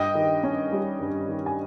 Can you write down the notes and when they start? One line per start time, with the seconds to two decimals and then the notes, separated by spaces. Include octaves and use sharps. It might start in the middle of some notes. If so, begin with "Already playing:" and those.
Already playing: G2 D#5 G5
0.15 D#3
0.44 C#4
0.72 G3
1.00 G2
1.28 D#3
1.46 G#5